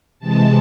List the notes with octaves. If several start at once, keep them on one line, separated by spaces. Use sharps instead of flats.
C3 E3 G#3 A5